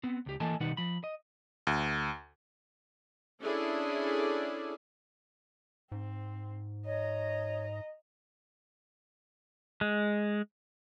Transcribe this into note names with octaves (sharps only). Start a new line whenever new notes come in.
B3 C4
C#2 G4
E3 A#3 A4 D#5 G#5 A5
B2 D#3 G3 D#4 B4 F#5
F3 B5
D#5
D2
C#4 D4 E4 G#4 A4 D5
G#2 C4
C#5 D#5 A#5
G#3